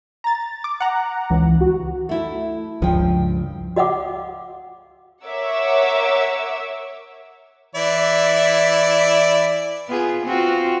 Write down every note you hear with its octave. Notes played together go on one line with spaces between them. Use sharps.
A#5 A6
D6
F#5 A#5
C#2 E3
F#4
A3 E4
C#2 G2 F3 G5
F#4 D#5 F5 F#5 D6
A#4 C#5 E5 F#5 D6 E6
E3 E4 D5
B3 F4 G#4
C4 F4 F#4